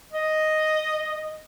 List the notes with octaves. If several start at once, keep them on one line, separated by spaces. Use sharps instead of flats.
D#5